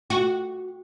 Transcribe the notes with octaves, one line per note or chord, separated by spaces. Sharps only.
F#4